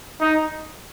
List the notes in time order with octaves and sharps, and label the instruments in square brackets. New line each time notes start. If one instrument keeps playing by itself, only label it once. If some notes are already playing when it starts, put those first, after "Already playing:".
[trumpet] D#4